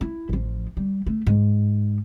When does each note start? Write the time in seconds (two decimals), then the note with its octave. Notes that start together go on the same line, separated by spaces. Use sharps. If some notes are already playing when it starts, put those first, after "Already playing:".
0.01 E4
0.29 A1 F3
0.77 G3
1.07 A3
1.27 G#2